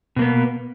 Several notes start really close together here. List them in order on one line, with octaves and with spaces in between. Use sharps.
B2 A#3 B3